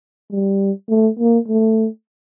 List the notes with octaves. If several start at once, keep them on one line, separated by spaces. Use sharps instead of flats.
G3
A3
A#3
A3